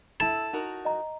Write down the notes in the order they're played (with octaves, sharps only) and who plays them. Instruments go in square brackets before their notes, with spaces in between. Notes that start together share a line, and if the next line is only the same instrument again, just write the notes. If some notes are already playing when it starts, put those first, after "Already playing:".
[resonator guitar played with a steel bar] E4 A4 [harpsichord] A5
[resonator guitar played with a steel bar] D#4 F#4 A#4
[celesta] D#5 A#5